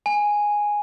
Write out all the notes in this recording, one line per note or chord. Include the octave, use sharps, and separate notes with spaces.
G#5